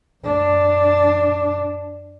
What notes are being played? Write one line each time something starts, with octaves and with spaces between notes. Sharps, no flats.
F#2 D4